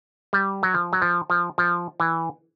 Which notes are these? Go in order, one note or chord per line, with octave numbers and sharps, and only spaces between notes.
G3
F#3
F3
F#3
F3
F3
F3
E3